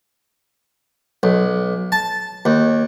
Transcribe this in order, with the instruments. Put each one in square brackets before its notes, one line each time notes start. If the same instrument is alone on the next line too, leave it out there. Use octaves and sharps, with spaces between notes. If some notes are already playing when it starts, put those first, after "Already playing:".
[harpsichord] B1
A5
D#2